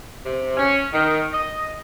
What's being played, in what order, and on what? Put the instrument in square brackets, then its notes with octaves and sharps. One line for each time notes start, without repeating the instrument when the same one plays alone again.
[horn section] C3
C#4
D#3
D#5